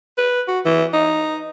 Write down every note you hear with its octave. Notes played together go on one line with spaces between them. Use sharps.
B4
F#4
E3
D#4